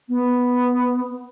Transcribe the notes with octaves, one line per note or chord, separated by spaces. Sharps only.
B3